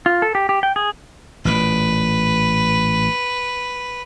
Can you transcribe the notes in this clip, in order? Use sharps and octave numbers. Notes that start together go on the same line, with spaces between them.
F4
A4
G4
G4
G5
G#4
A1 A#2 B4